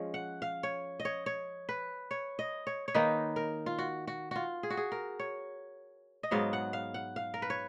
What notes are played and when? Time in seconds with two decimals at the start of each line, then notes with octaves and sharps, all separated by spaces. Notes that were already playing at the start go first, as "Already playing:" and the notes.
Already playing: F3 G#3 C#4
0.14 F#5
0.42 F5
0.63 C#5
1.00 D#5
1.05 C#5
1.26 C#5
1.69 B4
2.11 C#5
2.39 D#5
2.67 C#5
2.88 C#5
2.94 D#3 A#3 D#4 B4
3.36 A#4
3.66 F4
3.79 F#4
4.07 F#4
4.31 F4 F#4
4.63 G#4
4.70 F#4
4.77 G#4
4.92 A#4
5.20 C#5
6.23 D#5
6.31 G#2 F#3 B3 F5
6.53 F#5
6.73 F5
6.94 F#5
7.16 F5
7.34 A#4
7.42 B4
7.50 C#5